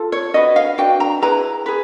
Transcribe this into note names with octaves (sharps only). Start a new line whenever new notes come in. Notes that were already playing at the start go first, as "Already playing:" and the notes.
Already playing: F4 A4
C#5
D4 F#4 B4 D#5
F5
D4 F#4 B4 G5
A#5
E4 G#4 B4 A#5
G#4 B4